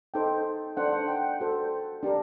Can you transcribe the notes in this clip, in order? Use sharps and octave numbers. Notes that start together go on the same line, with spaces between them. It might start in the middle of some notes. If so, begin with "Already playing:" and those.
D#4 A4 C5 G5
D4 A4 C5 F#5
F#5
G5
F#4 A4 C5
D4 G4 A#4